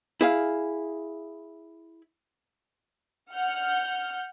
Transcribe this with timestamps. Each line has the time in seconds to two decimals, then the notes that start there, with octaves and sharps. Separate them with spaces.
0.21 E4 G#4 F5
3.33 F#5 F6 G6